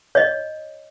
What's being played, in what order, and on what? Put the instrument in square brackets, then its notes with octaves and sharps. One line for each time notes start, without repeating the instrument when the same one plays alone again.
[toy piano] C#5 D#5